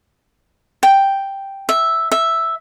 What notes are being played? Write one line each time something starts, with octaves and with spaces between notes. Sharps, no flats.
G5
E5
E5